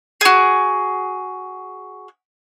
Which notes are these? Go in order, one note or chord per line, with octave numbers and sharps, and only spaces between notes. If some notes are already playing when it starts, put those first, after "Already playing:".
F#4 G#4